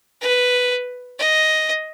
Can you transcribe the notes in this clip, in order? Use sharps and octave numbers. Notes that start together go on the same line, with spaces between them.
B4
D#5